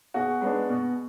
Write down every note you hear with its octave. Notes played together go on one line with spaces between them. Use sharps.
B2 F#4 G#4
G#3 B3 D4
B2